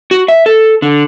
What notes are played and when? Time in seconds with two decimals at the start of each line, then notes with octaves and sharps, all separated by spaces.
0.11 F#4
0.28 E5
0.46 A4
0.82 D3